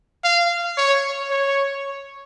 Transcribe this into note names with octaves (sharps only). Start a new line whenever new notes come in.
F5
C#5
C#5